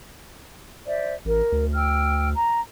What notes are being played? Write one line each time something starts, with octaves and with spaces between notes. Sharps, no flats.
C5 D5 E5
A1 A#4
D2
G5 E6 F6
A#5